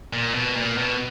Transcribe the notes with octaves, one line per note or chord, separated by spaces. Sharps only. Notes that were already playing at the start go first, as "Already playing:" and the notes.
A#2
B2
A#2
B2